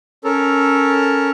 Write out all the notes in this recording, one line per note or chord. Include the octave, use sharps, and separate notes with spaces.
C#4 A4 A#4